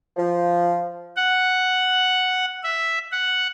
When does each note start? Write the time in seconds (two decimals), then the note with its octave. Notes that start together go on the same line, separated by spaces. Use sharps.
0.17 F3
1.16 F#5
2.63 E5
3.12 F#5